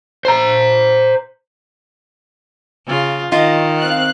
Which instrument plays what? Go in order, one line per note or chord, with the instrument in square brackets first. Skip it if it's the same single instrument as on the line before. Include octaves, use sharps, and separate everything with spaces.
[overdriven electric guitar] C5 A#5
[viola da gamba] C#3 F4
[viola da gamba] D#3 [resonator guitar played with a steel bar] F4 [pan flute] D#5
[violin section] C4 F5 F#6